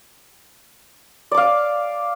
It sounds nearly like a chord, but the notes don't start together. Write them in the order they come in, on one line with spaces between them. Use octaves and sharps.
D5 D6 F5